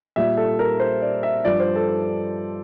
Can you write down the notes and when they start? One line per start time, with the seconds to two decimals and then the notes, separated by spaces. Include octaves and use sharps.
0.16 A#2 G3 E5
0.37 A4
0.59 A#4
0.80 C5
1.02 D5
1.23 E5
1.44 G2 F3 D5
1.60 C5
1.76 A4